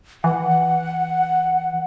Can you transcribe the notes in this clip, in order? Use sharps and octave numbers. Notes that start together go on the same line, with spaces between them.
E3 F#5